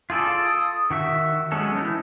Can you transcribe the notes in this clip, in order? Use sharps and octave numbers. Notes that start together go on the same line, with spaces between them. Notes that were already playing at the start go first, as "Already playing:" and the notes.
F4 G#4 A4 D5
D#6
D#3 F#4 E5
F#3 G#3 B3 C#4 A4
E3 C#4 D#4